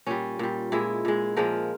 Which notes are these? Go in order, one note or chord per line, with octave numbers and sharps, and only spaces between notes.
A#2 G3 C#4
A#2 G3
A#2 G#3 E4
A#2 G#3
A#2 F3 G#3 A#4